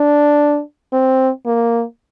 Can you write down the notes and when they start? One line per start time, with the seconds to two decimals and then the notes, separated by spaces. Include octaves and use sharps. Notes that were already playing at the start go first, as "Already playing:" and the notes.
Already playing: D4
0.93 C4
1.46 A#3